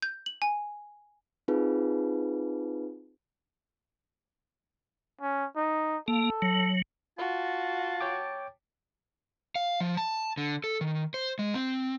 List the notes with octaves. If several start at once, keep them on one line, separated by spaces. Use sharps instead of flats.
G6
F#7
G#5
C4 D#4 F4 G#4 B4
C#4
D#4
A#3 A4
F#3
F4 F#4 A5
C#5 G5 D6
F5
F3
A5
D3
A4
D#3
C5
G#3
C4